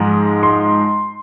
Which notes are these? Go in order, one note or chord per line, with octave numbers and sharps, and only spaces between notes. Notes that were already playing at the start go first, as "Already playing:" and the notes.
Already playing: G#2 F3 G#3
C6